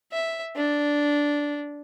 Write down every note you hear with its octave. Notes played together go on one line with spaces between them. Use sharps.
E5
D4